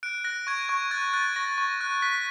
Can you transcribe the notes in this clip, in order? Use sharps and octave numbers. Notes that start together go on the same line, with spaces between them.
F#6 D7
F#6 A#6
C#6 G#6
C#6 G#6
F#6 A6
F#6 A6
C#6 A#6
C#6
F#6
F#6 B6